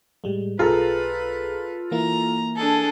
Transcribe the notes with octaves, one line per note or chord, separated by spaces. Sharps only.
A2 G3 G#3
B1 F4 G#4 A4 B4 A#5
E3 A#3 E4 A#5
D4 G#4 A4